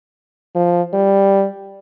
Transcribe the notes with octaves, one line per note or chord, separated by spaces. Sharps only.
F3
G3